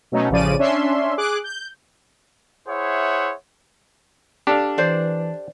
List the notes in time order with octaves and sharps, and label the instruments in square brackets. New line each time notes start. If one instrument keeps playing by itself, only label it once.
[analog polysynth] B2 F#3 A3 C#4 D#4
A1 C#3 F3 D5 D#7
C#4 D4 E5 C6
G#4 D6 F#6
G6
[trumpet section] E4 G#4 C5 C#5 E5 F#5
[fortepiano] D4 [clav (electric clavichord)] G4 A4 F5
[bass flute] E3 [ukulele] C5 D5